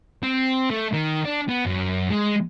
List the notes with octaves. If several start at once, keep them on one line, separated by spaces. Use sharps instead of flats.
C4
A3
D#3
D4
B3
F#2
G#3